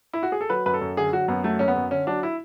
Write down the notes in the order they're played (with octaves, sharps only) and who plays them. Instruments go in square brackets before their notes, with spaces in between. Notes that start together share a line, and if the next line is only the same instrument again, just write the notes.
[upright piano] E4
F#4
G#4
A4
F#3 B4
F#2 B4
A4
F#2
D3 G#4
F#3 F#4
F#2 B3
F#3 A3
F#2 C#4
B3
F#2
D3 C#4
F#3 D4
E4